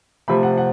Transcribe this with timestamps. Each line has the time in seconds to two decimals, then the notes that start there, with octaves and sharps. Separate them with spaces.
0.28 C3 F3 A3 B5
0.43 F#5
0.58 F#5